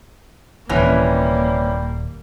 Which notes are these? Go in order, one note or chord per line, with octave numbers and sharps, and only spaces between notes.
D#1 C3 E3 G3 A#3 C#4